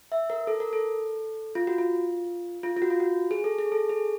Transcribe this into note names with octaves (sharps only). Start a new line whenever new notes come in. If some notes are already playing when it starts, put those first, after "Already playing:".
E5
A#4
A4
A#4
A4
F4
F#4
F4
F4
F4
F#4
F4
F#4
G#4
A4
G#4
A4
G#4